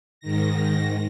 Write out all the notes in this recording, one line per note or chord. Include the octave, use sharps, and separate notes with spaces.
G#2 D#3 A#6